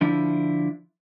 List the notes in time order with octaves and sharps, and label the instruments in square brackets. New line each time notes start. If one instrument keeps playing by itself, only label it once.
[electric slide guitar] D3 F3 D4 E4